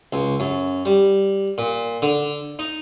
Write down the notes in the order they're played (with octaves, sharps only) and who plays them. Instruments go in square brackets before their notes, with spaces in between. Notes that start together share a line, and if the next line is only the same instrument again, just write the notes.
[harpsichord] C#2
F#2
G3
A#2
D3
D#4